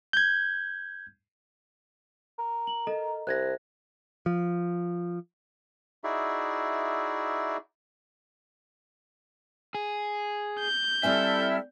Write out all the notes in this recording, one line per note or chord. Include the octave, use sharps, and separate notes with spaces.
G6 G#6
A#4
F#7
A4 D#5 A#5
C2 F#6 G#6 A#6
F3
D#4 E4 F#4 G#4 D5 E5
G#4
G6
G3 C4 E4 A4 E5 G#5 F6